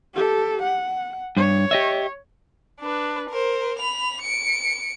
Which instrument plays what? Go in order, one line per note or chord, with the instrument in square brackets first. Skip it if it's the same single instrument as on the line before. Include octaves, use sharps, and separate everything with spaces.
[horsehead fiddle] G4 A4
F#5
[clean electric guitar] G2 [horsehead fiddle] C#5
[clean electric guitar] G4 D#5 E5
[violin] D4 B4
A#4 C5
B5 F7
C#7 D7